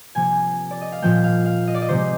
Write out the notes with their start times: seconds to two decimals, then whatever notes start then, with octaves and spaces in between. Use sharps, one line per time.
0.15 C3 F3 A#3 G#5
0.71 D5
0.81 D#5
0.92 F5
1.02 A#2 F3 A#3 G5
1.24 F5
1.46 F5
1.68 D#5
1.74 D5
1.82 D#5
1.89 C3 F3 G#3 C5